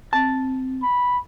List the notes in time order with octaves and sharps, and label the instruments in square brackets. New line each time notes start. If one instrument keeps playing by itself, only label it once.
[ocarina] C4 [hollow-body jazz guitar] A5
[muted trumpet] B5